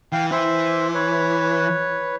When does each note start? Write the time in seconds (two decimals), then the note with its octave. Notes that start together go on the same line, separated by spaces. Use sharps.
0.12 E3 F5 G5
0.31 E3 C5 E5
0.94 B4 C#5